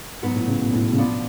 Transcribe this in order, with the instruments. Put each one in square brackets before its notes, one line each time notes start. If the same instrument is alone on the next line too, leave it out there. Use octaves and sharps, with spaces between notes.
[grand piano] G#2 [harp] F#3 B3 F#4 B4
[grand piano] A2
C#3
B2
A2
B2
C#3
[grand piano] B2 [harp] F3 B3 D4